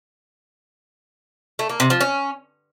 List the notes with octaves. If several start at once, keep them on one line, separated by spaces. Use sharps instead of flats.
A3
A#3
C3
F3
C#4